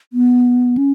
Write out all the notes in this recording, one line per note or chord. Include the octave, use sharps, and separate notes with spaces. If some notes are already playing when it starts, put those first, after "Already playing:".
B3
C#4